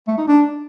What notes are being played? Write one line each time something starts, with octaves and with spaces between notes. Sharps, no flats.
A3
D#4
D4